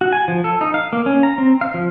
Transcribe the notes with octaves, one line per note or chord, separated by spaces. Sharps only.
F#4
G#5
F3
A4
D#4
F5
A#3
C#4
A#5
C4
F5
F3